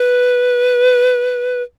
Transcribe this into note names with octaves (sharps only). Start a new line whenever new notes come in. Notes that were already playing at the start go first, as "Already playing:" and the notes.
Already playing: B4